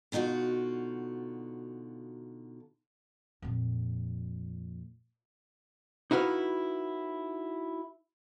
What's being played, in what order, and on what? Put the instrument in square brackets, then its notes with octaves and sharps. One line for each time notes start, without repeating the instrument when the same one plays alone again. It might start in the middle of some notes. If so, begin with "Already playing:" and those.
[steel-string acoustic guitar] B2 D3 D#4 F4 F#4
[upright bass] F2 A#2
[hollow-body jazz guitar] D#4 E4 F#4 A#4 B4 F5